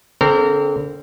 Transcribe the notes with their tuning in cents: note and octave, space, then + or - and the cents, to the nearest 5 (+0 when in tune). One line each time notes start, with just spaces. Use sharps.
D3 -40 C4 +0 A#4 -30